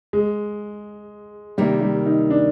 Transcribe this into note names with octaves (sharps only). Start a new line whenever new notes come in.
G#3
C3 D#3 G3 A#3
G3
D#4
D4